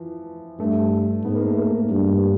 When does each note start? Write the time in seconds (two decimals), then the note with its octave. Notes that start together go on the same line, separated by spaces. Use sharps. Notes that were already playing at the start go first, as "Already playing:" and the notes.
Already playing: E3 F3
0.59 G2 A3
1.24 G#2 B3
1.36 A#3
1.47 A3
1.58 A#3
1.89 G2